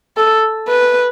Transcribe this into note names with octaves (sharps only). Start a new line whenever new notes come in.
A4
B4